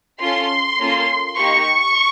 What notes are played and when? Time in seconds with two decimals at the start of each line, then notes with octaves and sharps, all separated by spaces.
0.21 C#4 F4 A4 C6
0.80 A#3 C#4 F4 A4
1.38 A#3 D#4 G4 C#6